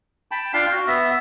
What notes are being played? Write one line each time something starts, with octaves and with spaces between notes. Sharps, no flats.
G5 A5 B5
D4 F4 F5 G5 C6
F#4
B3 E5